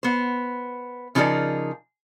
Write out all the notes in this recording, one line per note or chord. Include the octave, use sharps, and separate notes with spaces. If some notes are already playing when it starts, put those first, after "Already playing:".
B3 C5
C#3 F3 D#4 G#4 A#4 D5